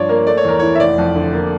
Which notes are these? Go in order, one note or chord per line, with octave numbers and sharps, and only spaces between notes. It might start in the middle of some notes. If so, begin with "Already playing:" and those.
Already playing: G2 F3 C#5 D5
A#3 A#4
A3 D5
C#5
E2 A#4
E3 C#5
E5
F1 D5
F2
D3
A#3